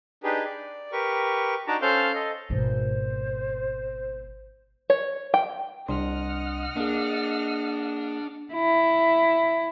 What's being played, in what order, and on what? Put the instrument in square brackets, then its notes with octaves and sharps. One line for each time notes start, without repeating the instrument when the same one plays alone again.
[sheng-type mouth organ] D4 D#4 G4 G#4 B4
D5
G4 A#4 B4 C#6
D4 D#4 F#4 A5 A#5 D6
C#4 A4 C5 F5 F6 G6
A4 D#5
[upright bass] G#1 B2 [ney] C5
[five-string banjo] C#5
G5
[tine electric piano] C2 D4 C6 [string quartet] D#5 F#5 F6
[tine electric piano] A#3 G#4 [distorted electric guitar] D4
[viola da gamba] E4